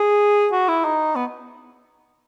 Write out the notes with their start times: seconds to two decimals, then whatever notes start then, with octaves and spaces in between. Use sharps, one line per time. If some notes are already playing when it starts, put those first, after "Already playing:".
Already playing: G#4
0.52 F#4
0.68 E4
0.85 D#4
1.15 B3